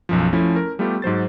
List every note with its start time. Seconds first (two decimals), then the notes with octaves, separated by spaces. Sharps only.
0.09 B1 F#2 F3
0.33 F3 A3 C#4 E4
0.56 A#4
0.79 G3 A3 B3 F4 G4
1.02 G#2 F#3 C5 A6